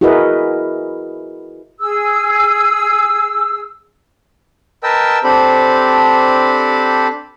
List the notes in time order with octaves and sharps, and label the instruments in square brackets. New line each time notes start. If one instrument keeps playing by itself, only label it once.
[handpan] E4 F#4 G#4 A#4 B4 D#5
[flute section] G#4 E6
[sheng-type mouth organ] A#4 B4 D#5 G5 A5 E6
C4 D4 G4 A4 C5 B5